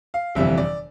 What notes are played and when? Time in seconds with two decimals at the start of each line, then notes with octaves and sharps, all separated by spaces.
0.14 F5
0.35 G1 F2 C3 E3 G3 E5
0.58 D5